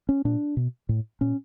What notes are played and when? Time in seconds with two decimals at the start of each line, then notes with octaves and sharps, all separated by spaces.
0.09 C#4
0.25 A#2 D4
0.57 B2
0.89 A2
1.21 A#2 C#4